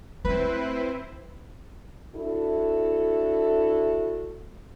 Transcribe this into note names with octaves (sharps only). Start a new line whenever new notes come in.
A3 C4 E4 B4 C5
D4 E4 F#4 A4